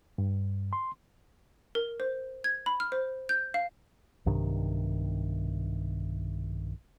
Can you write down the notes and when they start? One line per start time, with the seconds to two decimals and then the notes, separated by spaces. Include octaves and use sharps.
0.18 G2
0.73 C6
1.75 A#4
2.00 C5
2.44 G#6
2.66 B5
2.80 F6
2.92 C5
3.29 G6
3.54 F5
4.26 B1 G2 C3 D#3